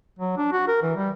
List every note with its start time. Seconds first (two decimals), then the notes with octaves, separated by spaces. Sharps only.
0.19 F#3
0.37 D4
0.52 F#4
0.68 A#4
0.83 E3
0.97 G3